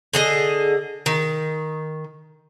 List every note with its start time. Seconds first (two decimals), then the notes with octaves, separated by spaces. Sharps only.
0.13 D3 G#4 D#5
1.06 D#3